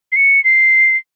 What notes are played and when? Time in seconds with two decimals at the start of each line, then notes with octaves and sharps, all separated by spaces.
0.12 C7
0.16 C#7
0.44 C7